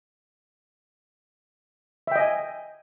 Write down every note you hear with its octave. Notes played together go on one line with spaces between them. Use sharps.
D#5 E5 G5 G#5